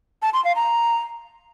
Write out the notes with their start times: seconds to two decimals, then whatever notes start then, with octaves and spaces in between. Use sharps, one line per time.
0.22 A5
0.33 C6
0.45 F5
0.56 A#5